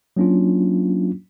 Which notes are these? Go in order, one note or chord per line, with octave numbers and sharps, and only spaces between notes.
F#3 A#3 C#4 D4 F4